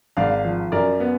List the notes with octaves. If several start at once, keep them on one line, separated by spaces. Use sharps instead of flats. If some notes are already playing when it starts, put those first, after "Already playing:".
G#1 D5 F5
F3
F#2 A#4 D5
B3